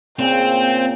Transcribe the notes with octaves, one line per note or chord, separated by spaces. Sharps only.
A#2 C#3 C4 G5